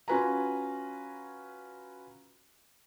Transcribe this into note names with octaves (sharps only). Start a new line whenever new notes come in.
C#4 F4 F#4 B4 G#5 A#5